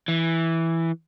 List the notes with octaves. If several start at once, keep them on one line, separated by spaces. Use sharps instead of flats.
E3